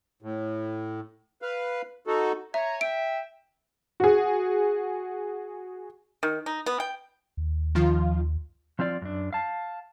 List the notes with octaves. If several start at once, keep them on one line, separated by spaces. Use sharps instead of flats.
A2
B4 F5
D#4 F#4 A4
C#5 E5 G#5 A#5
E5 G5 D7
F#4 G#4
D#3
D#4
B3
G5
D#2
D#3 F3 F4
F3 C4 F4 D5
F#2 D4
F5 A5